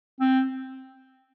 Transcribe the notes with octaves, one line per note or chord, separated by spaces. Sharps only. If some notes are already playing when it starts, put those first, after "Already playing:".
C4